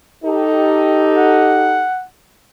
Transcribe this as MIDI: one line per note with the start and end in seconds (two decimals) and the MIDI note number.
0.24 1.85 63
0.24 1.85 67
0.24 1.85 69
1.17 2.05 78